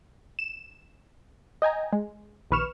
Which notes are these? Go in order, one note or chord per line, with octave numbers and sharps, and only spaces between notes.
E7
D#5 G5 G#5 A#5
G#3
A#1 D#2 B4 C#6 F6 E7